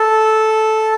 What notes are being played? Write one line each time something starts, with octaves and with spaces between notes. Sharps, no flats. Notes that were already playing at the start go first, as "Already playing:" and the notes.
Already playing: A4